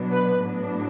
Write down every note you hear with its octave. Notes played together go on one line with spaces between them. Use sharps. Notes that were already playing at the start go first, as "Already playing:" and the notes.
Already playing: B2 F#3 B3 D4
B4
A2 F#3 B3 D4